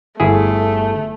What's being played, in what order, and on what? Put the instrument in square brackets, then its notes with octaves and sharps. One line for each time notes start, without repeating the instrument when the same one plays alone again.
[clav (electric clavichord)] G1 E4 G#4 [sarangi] A3